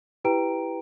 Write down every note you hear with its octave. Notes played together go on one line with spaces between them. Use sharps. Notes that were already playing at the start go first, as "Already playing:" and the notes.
E4 G4 B4 G5 A#5 D7